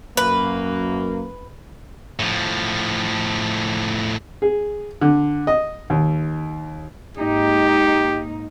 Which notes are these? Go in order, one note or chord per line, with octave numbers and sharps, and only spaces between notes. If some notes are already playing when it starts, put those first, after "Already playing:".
F#2 A#3 B4
A2 F3
G#4
D3
D#5
D#2
G#2 A#3 D#4 G4